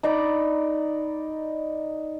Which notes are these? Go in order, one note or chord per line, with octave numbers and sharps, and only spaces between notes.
D#4 D5 A#5 B5